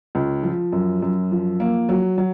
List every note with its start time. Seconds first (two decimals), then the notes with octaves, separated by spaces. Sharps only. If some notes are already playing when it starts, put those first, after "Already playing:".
0.15 C#2
0.43 F3
0.72 F#2
1.02 F#2
1.32 F3
1.60 A#3
1.89 F#3
2.18 F#3